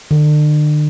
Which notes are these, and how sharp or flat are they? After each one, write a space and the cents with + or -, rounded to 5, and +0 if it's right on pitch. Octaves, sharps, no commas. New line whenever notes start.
D3 +40